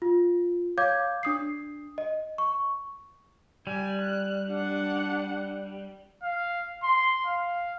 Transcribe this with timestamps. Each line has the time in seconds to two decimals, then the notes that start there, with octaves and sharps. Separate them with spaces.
0.02 F4
0.78 C#5 F5 D6 G6 G#6
1.23 D4 D#6 C7
1.98 D#5
2.38 C#6
3.67 G3 G#5
4.02 F#6
4.50 D4 F#5
6.24 F5
6.83 C6
7.26 F5